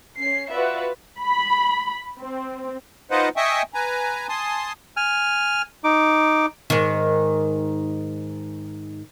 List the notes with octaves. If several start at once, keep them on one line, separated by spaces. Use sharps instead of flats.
C#4 C7
F4 F#4 B4 D5 E5
B5
C4
D#4 F4 B4 C5 D#5 F#5
D#5 E5 G5 G#5 C#6 D#6
B4 G#5 A#5
G#5 A5 C6 D#6
G#5 F6
D#4 D6
G#2 D#3